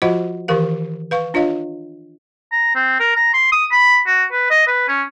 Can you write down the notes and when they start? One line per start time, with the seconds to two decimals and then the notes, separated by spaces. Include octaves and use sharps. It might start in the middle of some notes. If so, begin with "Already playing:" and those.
0.02 F3 F4 F#4 C5 D#5 F#5
0.48 D#3 E3 G4 A#4 F5
1.11 B4 F5 C#6
1.34 D4 F4 C#5 D#5 F5
2.52 A#5
2.75 C4
3.00 A#4
3.16 A#5
3.33 C6
3.52 D#6
3.72 B5
4.07 F#4
4.32 B4
4.50 D#5
4.67 B4
4.88 C#4